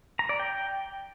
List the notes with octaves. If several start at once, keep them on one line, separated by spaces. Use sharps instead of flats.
A#5
D5
G5